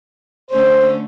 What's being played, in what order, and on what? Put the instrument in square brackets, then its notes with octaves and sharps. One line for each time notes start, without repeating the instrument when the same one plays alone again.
[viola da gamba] D3 A3 C#4 [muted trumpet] C5